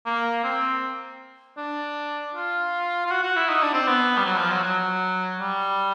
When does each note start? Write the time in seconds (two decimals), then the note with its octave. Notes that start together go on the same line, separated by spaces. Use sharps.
0.06 A#3
0.44 C4
1.57 D4
2.35 F4
3.07 F4
3.11 F#4
3.23 F#4
3.36 E4
3.49 D#4
3.62 D4
3.74 C4
3.87 B3
4.17 G3
4.25 F#3
4.38 F3
4.51 F#3
4.63 F#3
5.39 G3